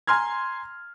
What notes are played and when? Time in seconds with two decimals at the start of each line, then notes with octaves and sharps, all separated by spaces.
0.07 G#5 A#5 C6 F6 G#6